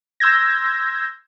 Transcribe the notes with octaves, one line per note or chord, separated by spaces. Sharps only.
C6 E6 G6 G#6 A#6